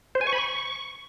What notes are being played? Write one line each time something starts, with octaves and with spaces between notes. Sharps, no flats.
C5
G#5
C#6
B5
C#6